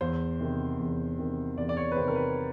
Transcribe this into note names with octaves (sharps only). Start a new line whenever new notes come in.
E2 C5
C3 D#3
E2
C3 D#3
E2 D5
D5
C#5
B4
C3 D#3 C5
A#4
B4